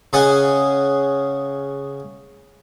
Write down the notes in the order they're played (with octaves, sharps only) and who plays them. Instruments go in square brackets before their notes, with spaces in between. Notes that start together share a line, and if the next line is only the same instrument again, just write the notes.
[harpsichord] C#3 C#4 G#4 D#5 F#5